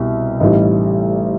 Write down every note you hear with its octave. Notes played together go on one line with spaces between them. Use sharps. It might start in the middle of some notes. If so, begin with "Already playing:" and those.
Already playing: C2 B2
A1 A2 G3 D#4